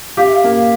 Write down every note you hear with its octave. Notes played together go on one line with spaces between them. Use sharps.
G4 F5
E5
F5
A#3